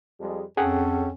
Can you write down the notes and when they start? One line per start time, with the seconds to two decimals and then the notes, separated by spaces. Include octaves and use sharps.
0.19 F2 G3 G#3
0.57 F2 C#4 G#4 A4 F#5 G5